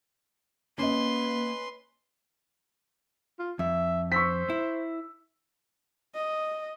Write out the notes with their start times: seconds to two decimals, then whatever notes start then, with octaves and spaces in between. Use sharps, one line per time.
0.78 A#3 C#4 B4 D#5 C6
3.39 F4
3.59 F2 E5
4.12 C5 C#6 E6 B6
4.50 E4
6.15 D#5